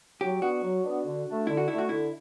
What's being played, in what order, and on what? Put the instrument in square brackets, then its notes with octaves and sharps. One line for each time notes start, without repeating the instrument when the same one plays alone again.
[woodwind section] F#3 [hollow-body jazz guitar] G4
[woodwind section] B3 D4 [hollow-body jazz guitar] F#4
[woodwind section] F#3
B3 D4
D3
A3 D4
[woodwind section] D3 [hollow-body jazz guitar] E4
[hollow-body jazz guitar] F#4
[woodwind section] A3 D4 [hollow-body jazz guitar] E4
[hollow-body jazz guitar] F#4
[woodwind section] D3 [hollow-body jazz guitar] E4